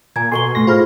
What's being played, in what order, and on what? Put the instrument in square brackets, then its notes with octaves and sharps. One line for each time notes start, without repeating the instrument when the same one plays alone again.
[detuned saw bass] A#2 [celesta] G#5 A#5 G#6
[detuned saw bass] B2 [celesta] A4 C#6 G7 [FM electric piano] G#5 C6
[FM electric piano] A2 C6 A#6
[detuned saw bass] G#2 [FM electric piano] F4 G#4 [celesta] C5 B5 F6